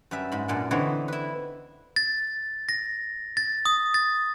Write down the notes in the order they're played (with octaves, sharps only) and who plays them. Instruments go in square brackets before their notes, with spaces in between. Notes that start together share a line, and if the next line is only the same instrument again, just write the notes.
[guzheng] F#2 G3 B4 E5
G#2 B5
F#2 A#2 D4 F#5
D3 E3 B3 C4 D#4 C#5
E4 B4
[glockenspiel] A6
A#6
A6
D#6
A6